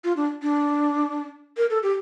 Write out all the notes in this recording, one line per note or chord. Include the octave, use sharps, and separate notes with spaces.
F4
D4
D4
A#4
A4
G4